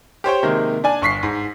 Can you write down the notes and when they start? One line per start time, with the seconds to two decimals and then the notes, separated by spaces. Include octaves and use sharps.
0.24 G4 C5 C#5 G5
0.43 C3 D#3 G#3 A#3
0.84 D4 D5 G#5
1.02 G1 C#6 B6 C7
1.23 G#2